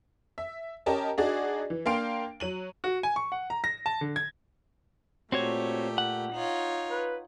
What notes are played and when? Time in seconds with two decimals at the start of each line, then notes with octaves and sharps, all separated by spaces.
0.38 E5
0.86 C#4 G4 A#4 D#5 A5
1.18 D4 D#4 F#4 G#4 D5
1.70 E3
1.86 A#3 D4 F5 G5 C6 D7
2.40 F#3 D#7 F#7
2.84 F#4
3.03 G#5
3.16 C#6
3.32 F#5
3.50 A#5
3.64 A#6
3.86 A5
4.01 D3
4.16 G#6
5.32 A#2 A3 C4 F#4 G4 C#5
5.98 F#5
6.33 D#4 F4 C#5
6.89 B4